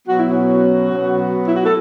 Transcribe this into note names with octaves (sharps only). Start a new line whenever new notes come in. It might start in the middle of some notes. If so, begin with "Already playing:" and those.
B2 F#3 B3 F#4
E4
C#4 F#4
B2 F#3 B3
E4
F#4
A4